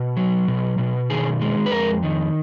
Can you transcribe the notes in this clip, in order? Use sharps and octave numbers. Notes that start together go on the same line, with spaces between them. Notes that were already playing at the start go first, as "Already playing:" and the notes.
Already playing: B2
F#3
B2
B2
D#3 G#4
G#3
B4
F2 A#4
D#3